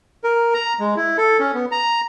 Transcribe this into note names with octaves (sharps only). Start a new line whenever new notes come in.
A#4
A#5
G#3
E4
A4
C#4
B3
A#5